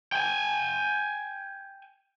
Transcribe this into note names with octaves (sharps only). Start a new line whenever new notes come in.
G5 G#5